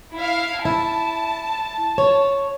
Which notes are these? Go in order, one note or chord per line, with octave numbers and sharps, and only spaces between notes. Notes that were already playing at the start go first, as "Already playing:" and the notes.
E4 F5
E4 A5
C#5